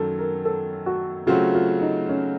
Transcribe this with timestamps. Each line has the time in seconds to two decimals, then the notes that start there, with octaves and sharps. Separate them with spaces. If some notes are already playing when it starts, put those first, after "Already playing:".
Already playing: F#2 D#3 F#3 A4
0.18 A#4
0.45 A4
0.86 F#4
1.27 C#3 F#3 A3 C4 F4 F#4
1.55 F4
1.81 D#4
2.09 C#4